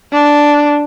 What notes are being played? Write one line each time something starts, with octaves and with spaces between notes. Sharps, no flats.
D4